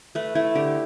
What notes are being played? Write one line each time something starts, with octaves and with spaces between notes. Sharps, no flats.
A3 B4
A3 E4
D3 G4